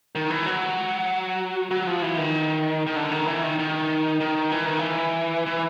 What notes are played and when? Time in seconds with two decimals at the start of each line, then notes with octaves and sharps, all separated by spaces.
0.15 D#3
0.30 E3
0.46 F#3
1.71 F#3
1.87 F3
2.02 E3
2.17 D#3
2.87 D#3
2.96 D3
3.12 D#3
3.27 E3
3.43 D#3
3.59 D#3
4.20 D#3
4.52 E3
4.66 D#3
4.79 E3
5.46 E3